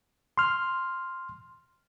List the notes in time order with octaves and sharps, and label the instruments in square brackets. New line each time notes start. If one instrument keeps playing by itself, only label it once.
[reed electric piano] C6 F6